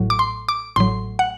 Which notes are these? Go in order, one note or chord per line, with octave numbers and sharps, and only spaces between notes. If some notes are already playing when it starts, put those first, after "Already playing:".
Already playing: A1 A2 F#3
D6
C6
D6
A1 A2 F#3 C6
F#5